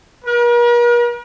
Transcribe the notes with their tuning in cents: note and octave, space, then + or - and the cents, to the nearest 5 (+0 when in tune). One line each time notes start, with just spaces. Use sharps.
A#4 +45